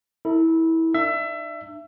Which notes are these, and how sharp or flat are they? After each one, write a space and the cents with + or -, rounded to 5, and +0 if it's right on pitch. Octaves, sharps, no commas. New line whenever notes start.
E4 -20 A4 +45
D4 +45 E5 +25